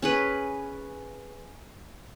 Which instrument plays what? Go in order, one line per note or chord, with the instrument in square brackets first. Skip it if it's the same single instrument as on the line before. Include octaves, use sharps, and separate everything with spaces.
[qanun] C#4 G#4 B4